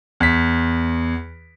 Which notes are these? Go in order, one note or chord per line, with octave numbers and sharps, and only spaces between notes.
E2 B6